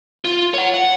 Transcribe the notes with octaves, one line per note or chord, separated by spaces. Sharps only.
F4
C#5 F#5
F#5